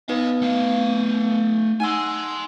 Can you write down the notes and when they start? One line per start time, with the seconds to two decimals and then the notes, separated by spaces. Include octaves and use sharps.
0.09 B3 D#4 B4 D#5 F5
0.42 A3 F5
1.80 D#4 F#5 G#5 C6 E6